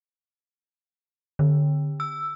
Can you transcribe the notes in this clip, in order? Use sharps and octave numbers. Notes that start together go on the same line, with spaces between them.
D3
E6